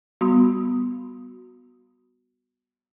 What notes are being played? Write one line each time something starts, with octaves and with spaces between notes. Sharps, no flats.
G3 B3 F#4 B5 C6 D#6